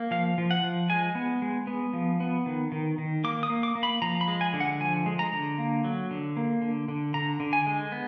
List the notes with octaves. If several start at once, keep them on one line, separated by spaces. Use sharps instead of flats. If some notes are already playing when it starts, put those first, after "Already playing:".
Already playing: A#3
F3 F5
F3
F#5
F3
G#3 G#5
B3
G#3
B3
F3
B3
D#3
D#3
D#3
A#3 D6
D#6
A#3
D6
A#3
B5
F3 A#5
B5
G#3
G#5
D3
F#5
F3 G#5
G#3
A#5
D3
A#3
F#3
D3
A#3
D3
D3
D3 A#5
D3
G#5
G#3
B3